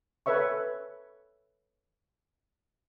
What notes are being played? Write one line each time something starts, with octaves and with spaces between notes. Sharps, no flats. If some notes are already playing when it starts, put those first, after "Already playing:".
A4 B4 C#5 E5 C#6